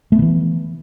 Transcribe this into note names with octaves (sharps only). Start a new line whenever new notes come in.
D#3 E3 A3 B3